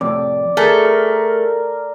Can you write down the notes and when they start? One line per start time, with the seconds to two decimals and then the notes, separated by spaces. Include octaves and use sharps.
0.01 F2 A2 C3 D5
0.57 A3 G#4 A#4
0.85 A#4